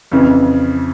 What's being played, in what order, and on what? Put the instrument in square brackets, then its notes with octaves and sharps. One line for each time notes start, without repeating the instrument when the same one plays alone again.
[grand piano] F2 C#3 E3